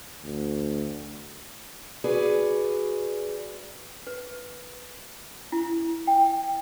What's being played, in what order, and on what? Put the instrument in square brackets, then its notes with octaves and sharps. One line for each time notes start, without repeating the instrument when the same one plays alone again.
[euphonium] D2
[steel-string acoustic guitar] F#4 G#4 B4 D5
[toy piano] B4
E4
G5